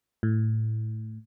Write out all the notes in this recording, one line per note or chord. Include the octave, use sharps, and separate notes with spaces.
A2